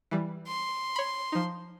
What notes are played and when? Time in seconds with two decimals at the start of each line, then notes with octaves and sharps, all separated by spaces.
0.11 E3 G3
0.47 C6
0.96 C#5 B5
1.32 F3 D#4